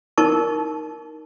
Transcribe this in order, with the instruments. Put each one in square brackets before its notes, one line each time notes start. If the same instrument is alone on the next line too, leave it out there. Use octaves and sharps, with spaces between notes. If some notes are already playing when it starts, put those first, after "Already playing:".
[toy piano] D#4 A#4 A5 C#6